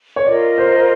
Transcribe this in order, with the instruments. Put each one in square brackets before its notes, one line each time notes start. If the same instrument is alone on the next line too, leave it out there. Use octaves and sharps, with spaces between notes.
[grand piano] C#5
[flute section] F4 A#4 D#5 [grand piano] D5
[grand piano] C5